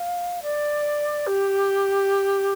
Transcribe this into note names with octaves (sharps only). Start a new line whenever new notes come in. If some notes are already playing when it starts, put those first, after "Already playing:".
Already playing: F5
D5
G4